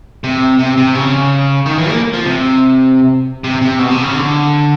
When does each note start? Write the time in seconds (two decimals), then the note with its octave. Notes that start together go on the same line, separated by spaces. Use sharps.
0.24 C3
0.59 C3
0.77 C3
0.95 C#3
1.66 D#3
1.78 E3
1.90 A#3
2.13 F3
2.25 C3
3.44 C3
3.62 C3
3.79 B2
3.91 C3
4.02 C#3
4.15 D3